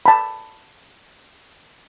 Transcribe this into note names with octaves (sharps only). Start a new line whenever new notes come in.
A5 B5